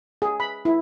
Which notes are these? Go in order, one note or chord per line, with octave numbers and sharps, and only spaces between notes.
G#4
B5
E4